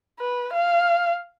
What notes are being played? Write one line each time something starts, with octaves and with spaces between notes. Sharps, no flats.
B4
F5